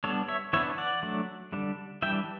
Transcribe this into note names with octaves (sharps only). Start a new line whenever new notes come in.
G3 B3 D4 A4 C#5
C#5 E5
E3 B3 D4 C#5 E5
D5 F#5
F#3 A3 D4
D3 G3 D4
E3 G3 D4 E5 G5